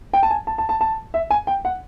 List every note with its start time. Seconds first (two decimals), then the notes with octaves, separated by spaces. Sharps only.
0.13 G5
0.23 A5
0.31 G#5
0.47 A5
0.58 A5
0.69 A5
0.81 A5
1.14 E5
1.30 G#5
1.47 G5
1.65 F#5